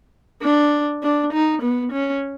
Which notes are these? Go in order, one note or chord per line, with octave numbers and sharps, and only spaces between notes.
D4
D4
D#4
B3
C#4